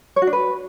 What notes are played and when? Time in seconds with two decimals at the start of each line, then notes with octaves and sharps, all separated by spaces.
0.16 C#5
0.22 F#4
0.27 D4
0.33 B4